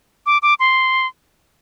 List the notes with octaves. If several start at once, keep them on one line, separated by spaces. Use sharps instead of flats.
D6
D6
C6